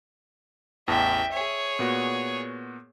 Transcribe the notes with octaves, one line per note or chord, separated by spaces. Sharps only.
A1 E2 E5 G5 A5
G#4 C#5 E5
A#2 B3 F#4